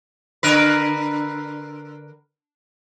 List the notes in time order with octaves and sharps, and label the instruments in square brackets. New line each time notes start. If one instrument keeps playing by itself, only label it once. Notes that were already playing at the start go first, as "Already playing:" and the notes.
[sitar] D3 A#4 B4